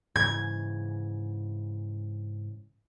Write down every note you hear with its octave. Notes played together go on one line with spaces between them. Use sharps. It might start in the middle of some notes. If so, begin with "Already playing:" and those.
G#2 C#3 E3 G#6